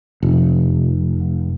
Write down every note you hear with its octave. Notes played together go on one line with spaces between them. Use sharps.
F1